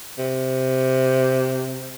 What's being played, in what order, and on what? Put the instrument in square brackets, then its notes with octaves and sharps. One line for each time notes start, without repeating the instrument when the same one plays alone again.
[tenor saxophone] C3